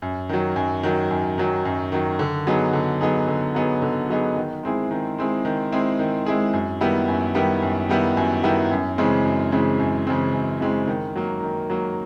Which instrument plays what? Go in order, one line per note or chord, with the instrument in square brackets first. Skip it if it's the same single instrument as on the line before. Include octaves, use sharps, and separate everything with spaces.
[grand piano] F#2
D#3 F#3
F#2
D#3 F#3
F#2
D#3 F#3
F#2
D#3 F#3
D3
F#3 B3 D#4 G#4
D3
F#3 B3 D#4 G#4
D3
F#3 B3 D#4 G#4
D3
F#3 B3 D#4 G#4
D#3
G#3 C4 E4 G#4
D#3
G#3 C4 E4 G#4
D#3
G#3 C4 E4 G#4
D#3
G#3 C4 E4 G#4
F#2
D#3 G3 B3 E4
F#2
D#3 G3 B3 E4
F#2
D#3 G3 B3 E4
F#2
D#3 G3 B3 E4
F#2
C#3 E3 G#3 C4
F#2
C#3 E3 G#3 C4
F#2
C#3 E3 G#3 C4
F#2
C#3 E3 G#3 C4
D#3
F#3 A#3
D#3
F#3 A#3